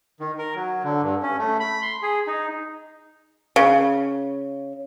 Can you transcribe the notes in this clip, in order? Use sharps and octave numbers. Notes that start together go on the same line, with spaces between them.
D#3
A#4
F#3
D3
G2
C#4
A3
B5
C6
G#4
D#4
C#3